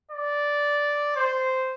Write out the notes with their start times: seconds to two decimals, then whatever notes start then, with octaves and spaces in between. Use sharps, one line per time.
0.11 D5
1.16 C5